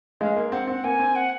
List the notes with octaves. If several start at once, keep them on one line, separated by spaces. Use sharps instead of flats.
G#3 F5
A#3
C4 F#5
C4 F#5
A#3 G#5
C4
F#5